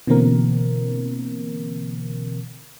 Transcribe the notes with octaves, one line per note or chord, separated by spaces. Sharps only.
B2 D3 E3 A#3 C4 A#4